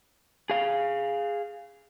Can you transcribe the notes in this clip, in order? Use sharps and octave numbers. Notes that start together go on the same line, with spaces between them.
G#4 F5